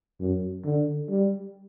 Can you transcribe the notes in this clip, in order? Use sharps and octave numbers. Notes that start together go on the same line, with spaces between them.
F#2
D3
G3